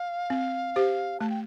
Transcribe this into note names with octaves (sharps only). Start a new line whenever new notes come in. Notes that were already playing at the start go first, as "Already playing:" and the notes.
Already playing: F5
C4
G4 C5
A3 A5
G5